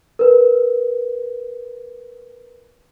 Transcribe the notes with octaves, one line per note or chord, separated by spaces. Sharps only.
A#4 B4